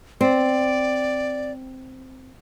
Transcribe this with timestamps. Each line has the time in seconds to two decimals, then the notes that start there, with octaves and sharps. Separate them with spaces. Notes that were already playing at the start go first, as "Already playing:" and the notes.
0.21 C4 D5